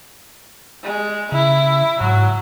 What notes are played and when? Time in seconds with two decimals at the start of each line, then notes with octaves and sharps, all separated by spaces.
0.83 G#3
1.32 C#3 E4
2.01 G#2 F#3